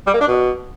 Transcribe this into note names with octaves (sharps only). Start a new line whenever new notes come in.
G3
A#3
D4
B2